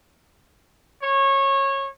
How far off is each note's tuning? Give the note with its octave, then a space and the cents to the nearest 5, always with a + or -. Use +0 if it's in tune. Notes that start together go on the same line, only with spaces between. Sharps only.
C#5 -20